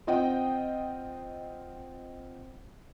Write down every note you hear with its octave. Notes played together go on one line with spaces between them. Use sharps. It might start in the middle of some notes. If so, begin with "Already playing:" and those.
C4 F4 D#5 F#5 G5